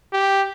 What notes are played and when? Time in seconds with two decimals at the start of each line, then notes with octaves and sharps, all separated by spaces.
0.13 G4